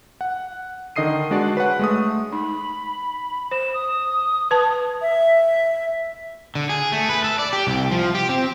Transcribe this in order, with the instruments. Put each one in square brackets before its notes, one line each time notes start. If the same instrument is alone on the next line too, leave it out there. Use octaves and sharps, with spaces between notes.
[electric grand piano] F#5
D3 D#3 D#5 D#6 C7 D#7
G#3 D4 F#4 D5 A5
B4 C#5 F#5
G#3 A3 D#6
[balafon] D#4 [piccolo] B5
[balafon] C5 [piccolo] E7
[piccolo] D#6
[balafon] B4 A5
[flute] E5
[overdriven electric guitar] D3
G#4
A3
B4
A4
D5
G4
C2
F3
G4
C4